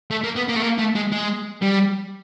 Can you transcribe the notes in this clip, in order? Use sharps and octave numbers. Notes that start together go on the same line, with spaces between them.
A3
A#3
B3
A#3
A3
A#3
A3
G#3
G#3
G3